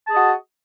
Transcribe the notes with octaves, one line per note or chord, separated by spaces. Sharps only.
F#4 G#4 D#5 A5